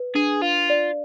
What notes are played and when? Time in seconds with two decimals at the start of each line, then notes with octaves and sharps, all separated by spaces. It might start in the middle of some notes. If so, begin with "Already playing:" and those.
Already playing: B4
0.15 D4 G#4
0.41 F4 F5
0.70 D5